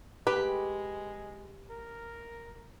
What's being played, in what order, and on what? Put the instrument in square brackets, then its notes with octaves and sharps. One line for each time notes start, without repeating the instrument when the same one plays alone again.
[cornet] G#3 [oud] G4 [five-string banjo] B4
[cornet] A#4